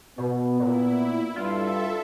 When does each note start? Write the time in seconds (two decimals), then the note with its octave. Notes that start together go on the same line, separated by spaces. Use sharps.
0.18 B2 B3
0.60 A#2 E4
1.36 G2 F4 A4 E5